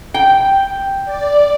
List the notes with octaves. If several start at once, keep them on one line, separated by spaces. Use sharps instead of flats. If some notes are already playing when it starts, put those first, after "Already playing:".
G5
D5